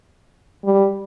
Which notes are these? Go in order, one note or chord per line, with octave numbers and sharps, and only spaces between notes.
G3